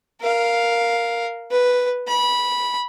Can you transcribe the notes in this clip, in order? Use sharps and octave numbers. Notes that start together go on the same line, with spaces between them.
A#4 F5
B4
B5